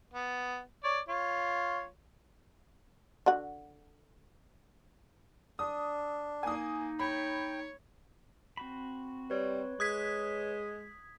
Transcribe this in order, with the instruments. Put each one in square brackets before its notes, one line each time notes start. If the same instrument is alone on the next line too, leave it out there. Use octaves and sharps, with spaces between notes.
[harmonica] B3
C#5 D5
F4 C#5
[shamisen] D3 F#4 F#5
[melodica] D4 [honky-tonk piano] D#6
[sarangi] A#3 [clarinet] D#4 [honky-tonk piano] G#5 D#6
[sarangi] C#5 [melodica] G5 [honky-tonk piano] B5
[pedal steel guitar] C4 F#4 B5
[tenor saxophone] G3 [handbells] B4 C#5
[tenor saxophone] G#3 [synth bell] D#6 G#6 B6 [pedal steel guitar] F#6